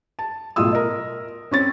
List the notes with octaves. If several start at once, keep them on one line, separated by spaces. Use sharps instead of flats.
A5
B1 A2 F4 D#6 E6
A#4 D#5
C4 C#4 A6